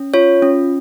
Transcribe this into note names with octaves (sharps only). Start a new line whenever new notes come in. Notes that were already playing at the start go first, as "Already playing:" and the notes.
Already playing: C#4
F4 C#5
C#4